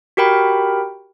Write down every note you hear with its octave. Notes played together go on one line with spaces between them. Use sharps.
F#4 G4 A#4 G5 B5